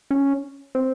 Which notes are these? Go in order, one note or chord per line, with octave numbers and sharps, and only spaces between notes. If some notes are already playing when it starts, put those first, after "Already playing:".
C#4
C4